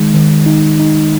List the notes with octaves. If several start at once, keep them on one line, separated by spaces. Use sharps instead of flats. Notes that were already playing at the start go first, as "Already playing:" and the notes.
Already playing: D#3 G#3 D#4
D#3
D#4
D#4